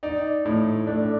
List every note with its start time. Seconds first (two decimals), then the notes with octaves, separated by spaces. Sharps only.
0.03 D#4 D5
0.45 A2
0.87 A3 D4